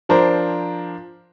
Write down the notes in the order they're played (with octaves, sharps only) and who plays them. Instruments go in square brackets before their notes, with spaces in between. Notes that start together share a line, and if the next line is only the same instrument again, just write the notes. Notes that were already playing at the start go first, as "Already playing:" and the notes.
[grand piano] F3 D4 A#4 C5 A#5